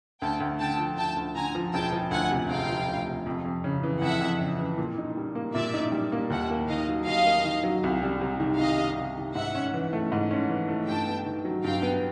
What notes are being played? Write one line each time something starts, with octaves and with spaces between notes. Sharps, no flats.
D2 G5 A5
D2
D3 G5 A5
F3
D2 G5 A5
D2
D3 G#5 A#5
F3
E1 G5 A5
F3
D2 F#5 G#5
C3
E1 F5 G5
F3
D2
C3
F2
F2
C#3
E3
F2 E5 F#5
F2
C#3
E3
A#2
D#4
G3
A#3
A#2 D5 E5
D#4
G3
A#3
D#2 E5 F#5
A#3
D#3 D#5 F5
F#3
D#2 D#5 F5
A#3
D#3
F#3
C2
G3
C3
D#3
C2 D#5 F5
G3
C3
D#3
G#2 E5 F#5
C#4
E3
A3
G#2
C#4
E3
A3
G2 G5 A5
B3
D#3
F#3
G2 F5 G5
B3